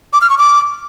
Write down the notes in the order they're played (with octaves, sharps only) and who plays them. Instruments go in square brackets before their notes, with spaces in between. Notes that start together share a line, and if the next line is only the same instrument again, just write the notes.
[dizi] D6
F6
C#6
D6